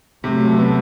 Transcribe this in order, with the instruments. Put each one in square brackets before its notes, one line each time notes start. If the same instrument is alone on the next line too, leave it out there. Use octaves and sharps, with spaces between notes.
[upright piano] C3 [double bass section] F#3 A3
[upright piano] B3